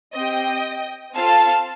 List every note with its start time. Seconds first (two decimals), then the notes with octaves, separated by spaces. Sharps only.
0.15 C4 G4 D#5 G5
1.14 C4 F4 A4 F5 A5